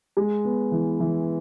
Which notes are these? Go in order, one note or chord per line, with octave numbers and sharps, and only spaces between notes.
G#3
B3
E3
E3